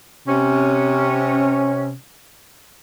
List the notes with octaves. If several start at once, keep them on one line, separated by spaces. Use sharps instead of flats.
C3 C#4